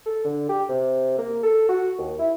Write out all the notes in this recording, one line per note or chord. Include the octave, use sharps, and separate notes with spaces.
A4
D3
G4
C3
A#3
A4
F#4
D#2
E4